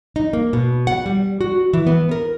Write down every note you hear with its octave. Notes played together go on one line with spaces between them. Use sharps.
D#4
A#3
B2
F#5
G3
F#4
E3
B3
A#4